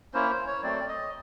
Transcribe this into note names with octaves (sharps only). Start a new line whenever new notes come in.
A#3 C#4 E4 C5
C5
C#5
F#3 A3 C4 D5
D#5